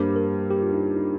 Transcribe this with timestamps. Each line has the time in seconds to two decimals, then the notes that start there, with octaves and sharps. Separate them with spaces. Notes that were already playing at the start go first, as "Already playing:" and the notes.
Already playing: G2 G3 A#3 C5
0.09 G4
0.16 A#4
0.51 G4
0.62 F4
0.73 D#4
0.96 D#4